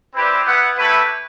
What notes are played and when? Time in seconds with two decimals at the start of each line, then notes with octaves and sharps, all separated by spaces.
0.14 C4 E4 G4 B4 D5
0.45 B3 E4 B4 F#5
0.77 A3 E4 G4 B4